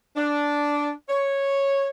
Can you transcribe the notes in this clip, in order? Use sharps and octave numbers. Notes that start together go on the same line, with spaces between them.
D4
C#5